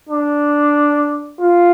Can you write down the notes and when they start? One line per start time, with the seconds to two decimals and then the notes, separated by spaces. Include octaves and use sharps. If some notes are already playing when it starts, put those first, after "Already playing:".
0.09 D4
1.41 F4